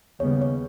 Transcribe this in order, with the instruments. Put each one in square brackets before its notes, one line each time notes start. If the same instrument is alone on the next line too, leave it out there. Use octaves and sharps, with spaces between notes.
[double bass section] D#2 C#3 G3 B3 [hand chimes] C#5
[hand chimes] C#5